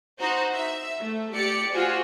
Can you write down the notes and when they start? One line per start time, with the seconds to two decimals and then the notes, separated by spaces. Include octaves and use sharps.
0.19 D#4 F#4 C5
0.54 E5
1.01 A3
1.34 G4 D5 C#7
1.73 F4 F#4 G#4 C5